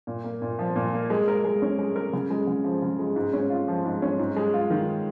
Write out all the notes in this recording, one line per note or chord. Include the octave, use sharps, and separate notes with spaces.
A#2
A#3
A#2
F3
A#2
A#3
G#3
A#4
G#3
C#4
G#3
A#4
C#3
G#3
C#3
F3
C#3
G#3
G#2
C#4
F4
F3
G#2
C#4
G#2
G#3
F4
D#3